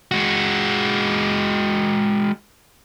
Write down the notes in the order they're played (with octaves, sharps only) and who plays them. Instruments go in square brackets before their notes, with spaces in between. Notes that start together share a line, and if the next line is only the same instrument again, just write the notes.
[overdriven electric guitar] G#3 F#4